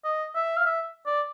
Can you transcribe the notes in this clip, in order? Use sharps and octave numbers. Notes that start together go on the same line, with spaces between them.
D#5
E5
F5
E5
D5